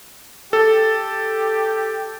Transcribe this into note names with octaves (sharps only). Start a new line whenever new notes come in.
G4 A4